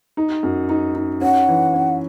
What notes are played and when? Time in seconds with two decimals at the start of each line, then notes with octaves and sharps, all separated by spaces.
0.17 D#4
0.43 F#2
0.69 D#4
0.95 D#4
1.21 C#4 F#5
1.48 E3
1.74 C#4